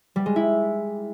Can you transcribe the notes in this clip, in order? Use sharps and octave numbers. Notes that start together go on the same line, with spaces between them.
G3
G#3
E4